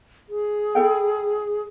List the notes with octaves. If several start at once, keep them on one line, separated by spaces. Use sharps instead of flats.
G#4
E4 A4 G5